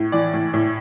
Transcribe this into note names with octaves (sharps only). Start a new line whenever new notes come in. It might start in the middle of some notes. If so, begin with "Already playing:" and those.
Already playing: A2
E3 D5
A2
A2